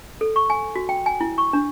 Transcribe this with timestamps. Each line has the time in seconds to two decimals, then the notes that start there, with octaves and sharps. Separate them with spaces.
0.21 A4
0.36 C#6
0.50 G#5
0.76 F#4
0.89 G5
1.06 G#5
1.21 E4
1.38 C#6
1.53 D4